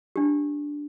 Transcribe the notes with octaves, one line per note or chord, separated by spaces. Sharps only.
D4 G4